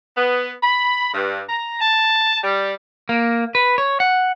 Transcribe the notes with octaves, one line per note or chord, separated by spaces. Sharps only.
B3
B5
G2
A#5
A5
G3
A#3
B4
C#5
F#5